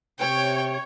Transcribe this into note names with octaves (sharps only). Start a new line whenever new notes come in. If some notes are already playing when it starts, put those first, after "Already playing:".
C3 C#5 G5